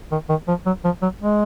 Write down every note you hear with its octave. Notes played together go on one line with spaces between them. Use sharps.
D#3
D#3
F3
F#3
F3
F#3
G#3